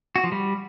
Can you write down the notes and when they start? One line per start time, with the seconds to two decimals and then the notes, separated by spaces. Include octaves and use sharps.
0.16 F#4
0.24 F3
0.32 G3